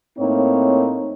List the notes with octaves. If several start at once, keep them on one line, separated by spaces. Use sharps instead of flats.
A2 A#3 C4 D#4 C#5